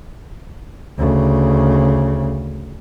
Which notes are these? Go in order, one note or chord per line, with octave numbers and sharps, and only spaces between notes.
D2 C#3